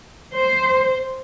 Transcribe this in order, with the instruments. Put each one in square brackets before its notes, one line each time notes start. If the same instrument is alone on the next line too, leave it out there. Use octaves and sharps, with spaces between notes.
[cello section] C5